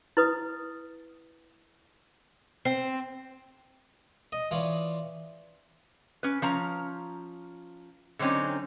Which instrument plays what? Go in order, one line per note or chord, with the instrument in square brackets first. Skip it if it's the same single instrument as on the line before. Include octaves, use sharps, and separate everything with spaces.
[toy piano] E4 B4 D#6
[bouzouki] C4
[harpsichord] D#5
E3 F4 C#5 D5
[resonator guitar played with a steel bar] C#4 B4
F3 C#4 A#5
D3 F#3 C4 C#4 D#4